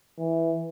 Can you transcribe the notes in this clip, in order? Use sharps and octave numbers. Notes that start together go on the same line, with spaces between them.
E3